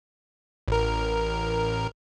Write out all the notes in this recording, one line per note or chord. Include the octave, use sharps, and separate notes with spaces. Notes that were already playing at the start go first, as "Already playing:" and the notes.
A1 A#4